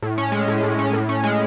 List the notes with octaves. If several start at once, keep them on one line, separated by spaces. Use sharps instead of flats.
A2
C#4
G#3
A2
A2
C#4
A2
C#4
G#3